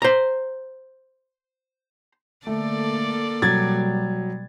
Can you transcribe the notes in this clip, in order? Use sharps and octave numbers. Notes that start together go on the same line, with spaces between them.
C5 A#5
D3 A3 A#3 A4 D5
B2 F#3 G3 G#6 A6